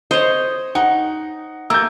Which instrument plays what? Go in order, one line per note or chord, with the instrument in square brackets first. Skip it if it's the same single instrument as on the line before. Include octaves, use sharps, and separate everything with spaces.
[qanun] C5 C#5 [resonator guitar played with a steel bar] D#5
[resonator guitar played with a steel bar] D#4 [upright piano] F#5
[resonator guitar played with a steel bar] A3 A#3 [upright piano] E6 G6